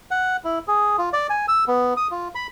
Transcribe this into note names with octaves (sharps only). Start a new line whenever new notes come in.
F#5
E4
G#4
F4
D5
G#5
E6
B3
D#6
F4
B5